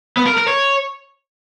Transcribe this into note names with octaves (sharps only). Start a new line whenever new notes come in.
B3
A#4
A#4
C#5